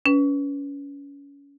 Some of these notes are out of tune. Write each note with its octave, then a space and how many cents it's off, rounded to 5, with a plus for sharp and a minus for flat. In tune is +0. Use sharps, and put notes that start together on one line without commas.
C#4 +30 B4 +0